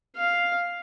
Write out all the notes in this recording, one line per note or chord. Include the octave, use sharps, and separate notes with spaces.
F5